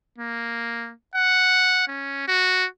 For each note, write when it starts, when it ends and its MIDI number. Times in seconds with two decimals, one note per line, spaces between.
0.19 0.93 58
1.15 1.87 78
1.88 2.27 61
2.28 2.66 66